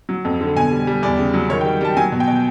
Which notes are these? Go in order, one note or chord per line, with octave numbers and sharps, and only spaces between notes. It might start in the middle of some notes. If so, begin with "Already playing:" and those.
F#3
F2
D3
B2 G#5
G3
G3
E2 D5
C#3
F#3
D#3 C#5
G5
G3
G3 A5
F#3 G#5
B2
G5
B2